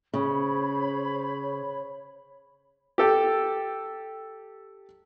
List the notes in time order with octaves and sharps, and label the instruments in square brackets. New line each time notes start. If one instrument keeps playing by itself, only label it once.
[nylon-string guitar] C#3 [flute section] C5 C#5 B5
[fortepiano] G4 A4 G5